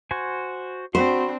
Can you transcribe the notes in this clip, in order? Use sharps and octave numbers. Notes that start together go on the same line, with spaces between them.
F#4 C5 G#5
C4 D4 F#4 C5 B5 C6